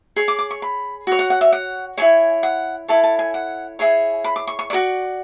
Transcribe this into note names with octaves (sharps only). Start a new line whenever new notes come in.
G#4 C#5
D6
D6
C#6
B5
F#4 C#5
F#5
F#5
E5
F#5
E4 G#4 C#5 G#5
F#5
E4 A4 C#5 A5
A5
G#5
F#5
E4 G#4 C#5 G#5
B5
D6
C#6
C#6
F#4 A4 D5 C#6